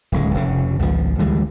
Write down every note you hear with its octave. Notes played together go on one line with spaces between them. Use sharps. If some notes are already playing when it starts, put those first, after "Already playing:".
D1 C#2 G#3
F1 C#3
G#1 C#2 F3
D2 E3 G3 G#3